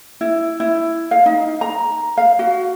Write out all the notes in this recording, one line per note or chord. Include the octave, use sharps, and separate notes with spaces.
E4
E4
F5
D#4
A#5
F5
F#4